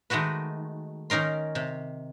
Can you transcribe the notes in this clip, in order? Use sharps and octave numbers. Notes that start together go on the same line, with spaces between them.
D#3 G#3 A3 F#4 B4
D#3 C#4 D#4 A#4 C6
C3